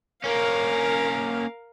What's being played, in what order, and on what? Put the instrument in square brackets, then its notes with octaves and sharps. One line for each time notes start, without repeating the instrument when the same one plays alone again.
[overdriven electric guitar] A#3 C#4 [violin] A#4 F5